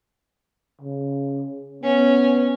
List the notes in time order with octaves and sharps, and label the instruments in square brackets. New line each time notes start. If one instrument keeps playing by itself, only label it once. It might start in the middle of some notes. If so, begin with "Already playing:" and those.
[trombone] C#3
[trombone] B3 [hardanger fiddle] C#4